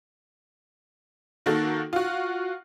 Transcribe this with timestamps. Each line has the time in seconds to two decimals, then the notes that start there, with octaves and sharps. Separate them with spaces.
1.46 D#3 A#3 F#4 A4
1.93 F4 F#4